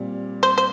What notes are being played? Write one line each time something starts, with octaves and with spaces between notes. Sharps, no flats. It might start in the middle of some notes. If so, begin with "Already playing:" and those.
Already playing: A#2 G3 C4
C5
C5